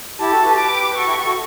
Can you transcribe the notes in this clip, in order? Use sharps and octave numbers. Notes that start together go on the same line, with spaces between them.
E4 G4 A5
F#4 A4
G4 B4
D6
F#4 A4 C#6
E4 G4
F#4
F#4 A4